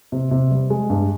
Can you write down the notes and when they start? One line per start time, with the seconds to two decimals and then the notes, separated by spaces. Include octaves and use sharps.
0.12 C3
0.31 C3
0.51 G3
0.70 G#3
0.90 G2